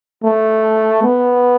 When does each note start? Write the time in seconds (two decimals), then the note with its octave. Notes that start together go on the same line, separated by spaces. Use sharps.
0.24 A3
1.03 B3